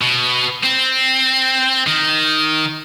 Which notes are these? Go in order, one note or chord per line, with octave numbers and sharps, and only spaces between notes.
B2
C4
D#3